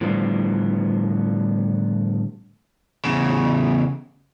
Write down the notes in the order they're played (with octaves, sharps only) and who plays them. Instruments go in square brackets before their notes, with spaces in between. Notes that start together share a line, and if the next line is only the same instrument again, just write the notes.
[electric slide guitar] A2 D3 F3 G3 A3 B3
[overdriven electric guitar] E2 C#3